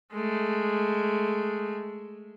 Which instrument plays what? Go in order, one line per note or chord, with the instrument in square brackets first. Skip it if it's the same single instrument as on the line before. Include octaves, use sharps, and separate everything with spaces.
[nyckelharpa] G#3 A3